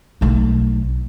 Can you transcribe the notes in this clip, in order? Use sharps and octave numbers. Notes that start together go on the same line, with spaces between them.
B1 A3